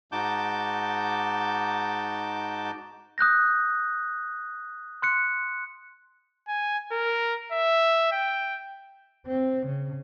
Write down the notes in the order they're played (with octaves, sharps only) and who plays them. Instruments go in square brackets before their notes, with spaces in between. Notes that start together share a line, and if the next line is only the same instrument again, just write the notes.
[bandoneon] G#2 D#4 F#4 A5 D6 G6
[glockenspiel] D#6 F#6 G6 A#6
C6 F#6 C#7
[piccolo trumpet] G#5
A#4
E5
G5
[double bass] C4
C#3